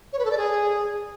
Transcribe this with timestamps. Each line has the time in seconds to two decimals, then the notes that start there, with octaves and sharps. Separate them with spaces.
0.13 C#5
0.19 B4
0.25 A4
0.31 D5
0.37 G#4